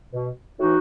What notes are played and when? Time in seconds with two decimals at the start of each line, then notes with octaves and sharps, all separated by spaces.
0.13 B2
0.59 A2 E3 D#4 F#4